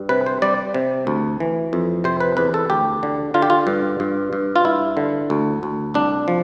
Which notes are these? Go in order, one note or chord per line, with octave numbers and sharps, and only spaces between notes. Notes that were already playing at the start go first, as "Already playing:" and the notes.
Already playing: G2 G3
C3 B4
C5
G3 D5
C3
D2
E3
F2
C3 C5
B4
E2 B4
A4
D2 G4
D3
D3 F4
G4
F4
G2
G2
G2
F4
G2 E4
D3
D2
D2
C2 D4
F3